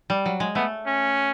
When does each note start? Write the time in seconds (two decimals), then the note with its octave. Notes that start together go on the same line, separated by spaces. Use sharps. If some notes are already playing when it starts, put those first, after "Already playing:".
0.10 G3
0.26 F#3
0.40 G#3
0.55 A3 B3
0.86 C#4